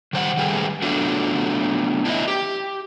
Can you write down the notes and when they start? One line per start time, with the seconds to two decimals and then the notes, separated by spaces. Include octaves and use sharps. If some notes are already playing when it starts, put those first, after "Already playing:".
0.13 D#3 G3 C5 D#5 F#5
0.37 D#3 G3 A3 G#4 B4
0.82 F#3 A3 B3 D4 F4 F#4
2.05 D4 E4 B4 C5 D#5 E5
2.28 G4